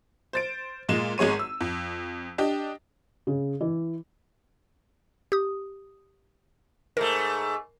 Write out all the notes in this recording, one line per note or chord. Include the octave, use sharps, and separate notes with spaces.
C5 A6 D7
A#2 G#3 E7
G#1 G#3 G#4 C#5 D#7
E6
F2
D4 G4 D#5
C#3
E3
G4 D#6
G#2 A3 A#4